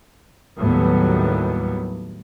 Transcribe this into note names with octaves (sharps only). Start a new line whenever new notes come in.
D#2 A2 F#3 G3 B3